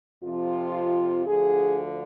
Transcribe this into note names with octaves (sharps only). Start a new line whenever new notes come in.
F2 C3 F3 F4
D2 D3 F3 G#4